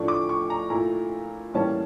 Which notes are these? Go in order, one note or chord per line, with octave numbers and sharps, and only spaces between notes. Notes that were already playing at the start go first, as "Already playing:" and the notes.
Already playing: A2 F3 A3 D4 C#6
D6
C#6
A#5
A#2 A3 E4 A#5
A2 E3 G3 A#3 C#4 A5